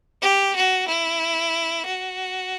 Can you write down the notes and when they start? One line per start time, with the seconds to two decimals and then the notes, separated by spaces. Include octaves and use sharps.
0.22 G4
0.56 F#4
0.88 E4
1.86 F#4